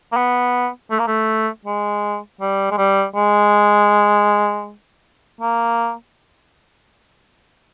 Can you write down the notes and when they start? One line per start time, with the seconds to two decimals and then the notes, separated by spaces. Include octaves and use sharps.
0.12 A#3
0.16 B3
0.91 A3
0.99 A#3
1.07 A3
1.65 G#3
2.41 G3
2.71 G#3
2.77 G3
3.15 G#3
5.41 A#3